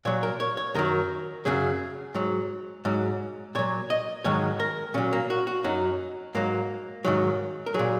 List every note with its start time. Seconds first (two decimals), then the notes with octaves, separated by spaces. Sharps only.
0.05 A#2 F#3 C#5
0.23 A#4
0.40 C#5
0.57 C#5
0.74 F#2 D#3 F#3 A#4
1.45 F#2 C#3 F#3 G#4
2.14 G#2 F#3
2.85 G#2 F#3
3.55 A#2 F#3 C#5
3.90 D#5
4.24 G#2 D#3 F#3 C#5
4.60 A#4
4.94 A#2 F#3 C#4
5.13 A#3
5.30 F#4
5.47 F#4
5.64 F#2 F#3 D#4
6.35 G#2 F#3 A#3
7.05 G#2 D#3 F#3
7.66 A#4
7.74 A#2 F#3 G#4